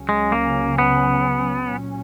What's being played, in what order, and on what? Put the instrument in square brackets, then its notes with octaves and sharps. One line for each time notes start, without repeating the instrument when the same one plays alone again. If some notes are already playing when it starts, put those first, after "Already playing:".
Already playing: [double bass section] C#2 C#3 F#3 C#4
[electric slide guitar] G#3
A#3
B3
[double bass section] A#2 F#3 C#4